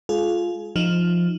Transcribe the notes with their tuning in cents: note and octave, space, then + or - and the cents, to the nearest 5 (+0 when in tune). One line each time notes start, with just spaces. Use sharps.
G#3 +0 F4 +0 G#4 +35
F3 +0 D#4 +0